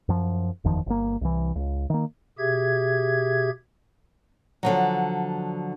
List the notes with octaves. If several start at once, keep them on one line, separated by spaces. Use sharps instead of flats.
F#2 F3
F#1 E2 D#3 F3
G1 A#3
C2 E3
C#2
D#3 A#3
B2 G4 G#4 E5 G#6
D3 F3 F#3